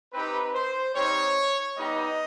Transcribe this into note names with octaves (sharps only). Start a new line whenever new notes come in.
C4 D#4 G4 B4
C5
G3 C4 D#4 C#5
G3 B3 D#4 G4 D#5